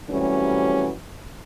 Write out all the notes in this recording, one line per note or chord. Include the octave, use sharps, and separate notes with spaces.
C3 E3 F#3 G3 A3 C#4